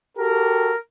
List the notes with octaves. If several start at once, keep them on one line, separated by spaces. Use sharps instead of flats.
F#4 G4 A4 A#4